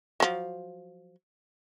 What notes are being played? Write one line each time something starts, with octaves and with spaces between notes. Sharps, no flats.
F3 F#3